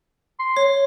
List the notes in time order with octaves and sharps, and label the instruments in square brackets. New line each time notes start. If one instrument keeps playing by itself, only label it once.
[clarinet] C6
[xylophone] C#5